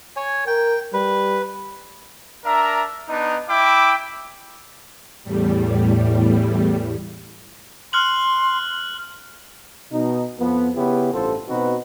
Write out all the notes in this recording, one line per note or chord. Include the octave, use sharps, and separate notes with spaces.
C#5 G#5
A#4 G5
G3 B4
D4 A#4 E5 A#5
B3 D4 D#4
E4 E5 G5 B5 D6
E2 A2 G3
C6 F6 F#6 F#7
B2 D#4
F2 F3 B3
C#3 B3 C#4 E4 G4
A1 G2 F4 A4 C5
B2 C4 D#4 F#4 B4